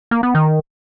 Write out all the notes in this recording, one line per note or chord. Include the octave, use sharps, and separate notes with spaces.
A#3
B3
D#3